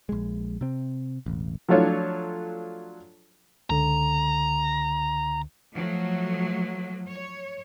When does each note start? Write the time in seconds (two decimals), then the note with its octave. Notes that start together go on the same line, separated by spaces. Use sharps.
0.09 A#1 G#3
0.61 C3 C4
1.26 E1 A1
1.68 F3 F#3 A3 D4 F4 C#5
3.70 C#2 D3 A#5
5.73 F3 F#3 A3
7.09 C#5